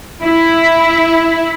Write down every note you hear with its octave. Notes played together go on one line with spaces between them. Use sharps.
E4